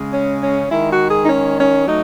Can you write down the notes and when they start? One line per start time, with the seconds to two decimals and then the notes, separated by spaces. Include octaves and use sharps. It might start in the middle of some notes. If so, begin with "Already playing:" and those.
Already playing: C#3 G#3
0.11 C#4
0.40 C#4
0.69 D#3 G#3 E4
0.89 F#4
1.08 G#4
1.23 D#4
1.28 C#4
1.58 C#4
1.87 F#3 A3 D#4